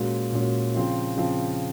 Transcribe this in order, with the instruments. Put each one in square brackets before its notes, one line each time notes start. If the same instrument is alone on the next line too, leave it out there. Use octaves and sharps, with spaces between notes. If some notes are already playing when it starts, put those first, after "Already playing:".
Already playing: [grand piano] A#2 G#3 C#4 F#4
A#2 G#3 C#4 F#4
C#3 F3 C4 F4
C#3 F3 C4 F4